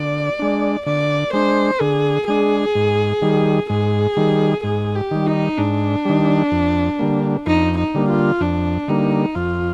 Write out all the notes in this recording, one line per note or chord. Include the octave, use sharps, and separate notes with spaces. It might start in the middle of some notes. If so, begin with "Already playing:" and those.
Already playing: D3 D5
G#3 D4
D3 D5
G#3 D4 C5
D3 G#4
G#3 D4 G#4
G#2
D#3 G3
G#2 G#4
D#3 G3
G#2 G#4
G4
D#3 G3
D#4
G#2 D4
D#3 G3
F2
D3 G3 A#3
F2 D#4
D#4
D3 G3 A#3
F4
F2 D4
D3 G3 A#3 D#4
F2 F4